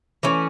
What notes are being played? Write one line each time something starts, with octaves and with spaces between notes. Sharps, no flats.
E3 A3 C#4